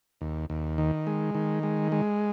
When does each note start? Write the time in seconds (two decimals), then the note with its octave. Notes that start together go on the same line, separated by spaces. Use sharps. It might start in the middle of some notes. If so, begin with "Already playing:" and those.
0.21 D#2
0.50 D#2
0.78 D#3
1.07 G#3
1.35 D#3
1.63 G#3
1.92 G#3